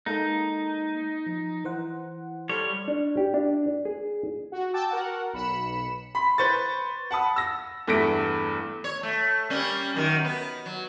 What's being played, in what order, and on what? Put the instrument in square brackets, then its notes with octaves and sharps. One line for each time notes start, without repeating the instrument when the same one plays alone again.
[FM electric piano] G#3 A#3 A4 [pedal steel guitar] D#4
[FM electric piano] F3
E3 C5 F#5
[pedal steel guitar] G3 C#5 [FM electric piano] A4 C5 F6
[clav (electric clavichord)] D4
G4
D4
G#4
[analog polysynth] F#4
G5 A5 D6 E6
F#4 A#4 F#5
B1 B5 C#7 E7
[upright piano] B5 C6 B6
B4 C5 B5 C#6 A6
F#5 A5 B5 D#6
E6 A#6
E2 G2 A3 A#6 B6 D7
[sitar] C#5
A3
G3 A#3 C#4
F#2 D#3 A#4
B3
F#3